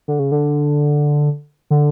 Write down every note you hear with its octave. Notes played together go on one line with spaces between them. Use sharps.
D3
C#3
D3
D3